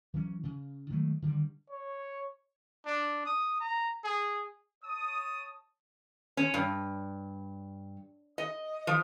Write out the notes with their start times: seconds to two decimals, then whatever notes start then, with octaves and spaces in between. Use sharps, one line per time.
0.14 E3 F#3 C#4
0.44 C#3
0.90 D#3 F#3 G#3 A3
1.22 D3 D#3 G3
1.70 C#5
2.86 D4
3.26 D#6
3.60 A#5
4.04 G#4
4.84 C#5 A5 D#6
6.37 C#4
6.54 G2
8.38 D#5
8.87 F3